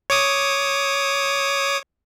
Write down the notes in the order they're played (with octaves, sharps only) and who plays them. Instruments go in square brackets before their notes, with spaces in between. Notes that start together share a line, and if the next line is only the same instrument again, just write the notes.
[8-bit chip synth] C#5 D6 D#6